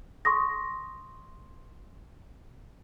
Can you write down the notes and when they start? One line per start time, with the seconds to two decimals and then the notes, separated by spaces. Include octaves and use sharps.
0.25 C6 C#6 D#6 A#6